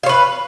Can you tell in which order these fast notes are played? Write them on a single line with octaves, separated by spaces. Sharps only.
F5 C#5 B4